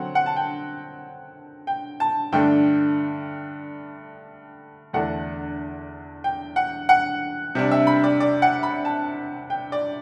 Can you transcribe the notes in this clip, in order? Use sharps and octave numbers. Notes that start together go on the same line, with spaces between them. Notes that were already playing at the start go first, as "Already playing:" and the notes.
Already playing: D3 F#3 C4 F#5
F#5
A5
G5
G5
A5
G2 D3 A3 D4 G5
E2 D3 A3 D4 F#5
G5
F#5
F#5
C3 G3 D4
E5
B5
D5
D5
F#5
B5
A5
G5
D5